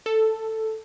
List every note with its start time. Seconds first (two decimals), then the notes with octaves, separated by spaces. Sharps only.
0.06 A4